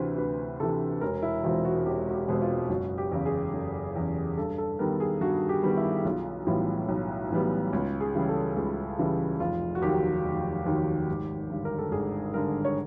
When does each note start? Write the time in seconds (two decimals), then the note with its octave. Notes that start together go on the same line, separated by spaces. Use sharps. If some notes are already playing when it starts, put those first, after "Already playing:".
Already playing: D2 C3 E3 B4 C5
0.18 D2 B4
0.60 C3 E3 A4
1.01 E1 A#4
1.23 E4
1.44 E2 B2 G#3 C4 F4
1.65 F#4
1.86 E1 G4
2.09 F#4
2.14 G4
2.27 E2 B2 G#3 C4
2.42 F4
2.70 F#1 F#4
2.98 G4
3.11 E2 C#3
3.26 G#4
3.53 F#1 A4
3.96 E2 C#3
4.37 G2 A4
4.58 A4
4.79 D#3 G3 B3 A#4
5.00 G#4
5.21 G2 F#4
5.49 G4
5.63 D#3 G3 B3
5.77 E4
6.05 B1 F4
6.47 A2 E3 G3 B3 F4
6.89 B1
7.31 A2 E3 G3 B3
7.73 C#2
8.00 G#4
8.15 C#3 E3 G3
8.29 A4
8.56 C#2 G#4
8.98 C#3 E3 G3
9.40 F1 F4
9.75 F#4
9.82 D#2 D#3 F#3 G4
10.24 F1
10.66 D#2 D#3 F#3
11.08 G#1
11.50 G2 D3
11.65 A#4
11.78 A4
11.92 G#1 G#4
12.34 G2 D3 A#4
12.65 C#5